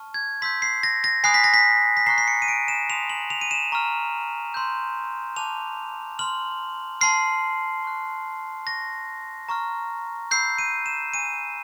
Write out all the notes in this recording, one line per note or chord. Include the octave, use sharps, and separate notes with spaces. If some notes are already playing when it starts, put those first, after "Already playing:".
Already playing: A5 C#6 F6
G#6
C6 E6 G6 B6
C7
A#6
A#6
G#5 B5 D#6 F#6 C7
B6
A#6
B6
B6
A#5 C#6 F#6 C7
C7
C#7
D#7
D7
E7
A5 C6 D#6 F7
F#7
F7
D#7
E7
A#5 C#6 F6
C6 E6 G6
A5 D6 F#6 F7
C6 F6 F#7
A5 C6 F6 C7
C#6 F#6
C#6 F#6 A#6
A#5 C#6 F6
B5 E6 G6 C7
D#7
E7
G#5 C#6 E6 G6 D#7